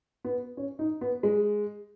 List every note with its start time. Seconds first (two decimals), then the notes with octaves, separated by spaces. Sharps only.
0.24 B3
0.57 C#4
0.79 D#4
1.01 B3
1.23 G#3